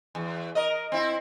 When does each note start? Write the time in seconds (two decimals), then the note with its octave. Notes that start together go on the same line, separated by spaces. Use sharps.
0.15 E2
0.55 A#4 D#5
0.92 C4 E4